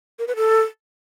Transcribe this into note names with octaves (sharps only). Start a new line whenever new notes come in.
A#4
B4
A4